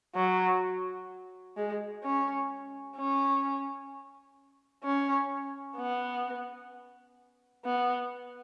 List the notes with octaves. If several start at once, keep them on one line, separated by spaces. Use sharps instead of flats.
F#3
G#3
C#4
C#4
C#4
B3
B3